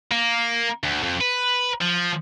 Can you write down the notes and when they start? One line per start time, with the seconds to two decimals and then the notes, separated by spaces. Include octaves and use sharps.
0.11 A#3
0.83 D2
1.03 F2
1.21 B4
1.81 F3